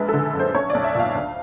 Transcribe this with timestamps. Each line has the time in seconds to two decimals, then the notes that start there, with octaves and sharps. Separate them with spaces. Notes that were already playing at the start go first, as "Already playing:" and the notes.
Already playing: A#1 G#3 B4
0.09 A4
0.14 D3
0.34 F#2
0.39 C5
0.54 B1 C#5
0.70 B1 D5
0.84 E5
0.95 A#2 F5
1.15 D2